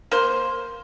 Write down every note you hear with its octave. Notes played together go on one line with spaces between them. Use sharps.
A#3 C5